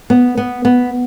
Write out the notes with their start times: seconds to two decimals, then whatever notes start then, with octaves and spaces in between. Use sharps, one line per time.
0.10 B3
0.38 B3
0.65 B3